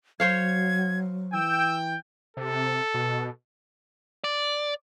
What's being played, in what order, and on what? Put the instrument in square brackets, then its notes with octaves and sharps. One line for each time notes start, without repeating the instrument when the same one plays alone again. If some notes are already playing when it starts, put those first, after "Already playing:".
[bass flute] F#3 [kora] C5 C#5 F5 [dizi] G#6
[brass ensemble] E3 G5 [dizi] E6
[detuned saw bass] C3 [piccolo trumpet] A4
[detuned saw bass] B2
[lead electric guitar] D5